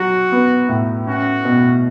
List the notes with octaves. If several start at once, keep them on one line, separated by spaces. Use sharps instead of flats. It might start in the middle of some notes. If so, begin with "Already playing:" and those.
Already playing: F#3 F#4
B3
A2
C#4 F#4
B2